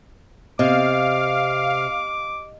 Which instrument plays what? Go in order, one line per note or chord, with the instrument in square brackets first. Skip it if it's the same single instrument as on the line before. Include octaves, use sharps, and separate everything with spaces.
[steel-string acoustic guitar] C3 [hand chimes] D#5 [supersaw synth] F5 [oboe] D6